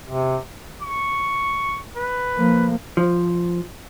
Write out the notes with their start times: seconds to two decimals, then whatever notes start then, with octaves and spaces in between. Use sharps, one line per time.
0.07 C3
0.82 C#6
1.96 B4
2.37 F3 A#3
2.97 F3